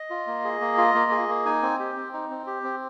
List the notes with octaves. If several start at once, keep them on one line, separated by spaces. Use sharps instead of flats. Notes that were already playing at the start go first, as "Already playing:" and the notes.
Already playing: D#5
F4
A#3
G#4
A#3
F4
A#3
G#4
A#3
D#4 G#5
C4
G4
C4
D#4
C4
G4
C4